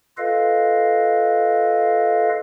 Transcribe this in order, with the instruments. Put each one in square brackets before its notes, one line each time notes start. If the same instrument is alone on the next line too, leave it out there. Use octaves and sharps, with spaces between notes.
[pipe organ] F4 A4 B4 D#5 F5